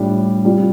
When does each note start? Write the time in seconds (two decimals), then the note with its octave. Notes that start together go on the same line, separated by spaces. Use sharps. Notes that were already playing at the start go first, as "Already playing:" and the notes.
Already playing: A2 G3 D4 F4
0.45 C3 G3 D4 F4